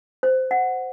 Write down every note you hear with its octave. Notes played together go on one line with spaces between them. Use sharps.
C5
F#5